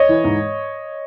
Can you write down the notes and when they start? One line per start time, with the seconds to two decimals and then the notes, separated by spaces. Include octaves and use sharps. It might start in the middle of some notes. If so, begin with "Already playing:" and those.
Already playing: C#5 D#5
0.09 E3
0.24 G#2